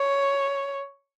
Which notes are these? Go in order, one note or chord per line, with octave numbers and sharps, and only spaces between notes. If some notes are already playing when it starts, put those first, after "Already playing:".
Already playing: C#5